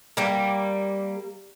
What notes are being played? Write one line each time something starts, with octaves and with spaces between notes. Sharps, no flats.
G3 A#3